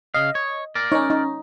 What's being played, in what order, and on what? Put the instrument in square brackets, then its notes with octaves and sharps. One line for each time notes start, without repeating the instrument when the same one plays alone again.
[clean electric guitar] C#3 F5 [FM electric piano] D#5
[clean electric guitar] C#5
A#4 D5
[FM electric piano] C#4 C#5 [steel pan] D#4
[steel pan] D#4